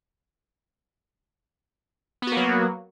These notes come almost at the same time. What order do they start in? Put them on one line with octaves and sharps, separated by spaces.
B3 F#4 A#3 F#3